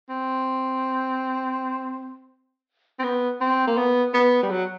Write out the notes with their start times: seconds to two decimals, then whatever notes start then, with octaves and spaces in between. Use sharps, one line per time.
0.09 C4
2.99 C4
3.04 B3
3.41 C4
3.67 A#3
3.77 B3
4.14 B3
4.43 G3
4.51 F#3